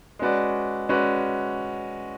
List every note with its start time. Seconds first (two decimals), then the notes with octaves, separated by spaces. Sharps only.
0.19 G#3 C#4 F#4 B4 D5
0.89 G#3 C#4 F#4 B4 D5